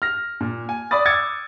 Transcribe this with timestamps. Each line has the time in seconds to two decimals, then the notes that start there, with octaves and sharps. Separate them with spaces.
0.02 F6 A#6
0.41 A#2
0.69 G#5
0.91 D5 B5 D#6 A6
1.05 D6 E6 G#6 A6 C#7